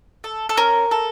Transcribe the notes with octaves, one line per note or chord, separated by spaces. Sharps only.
A4
A4
C#4 A#4
A4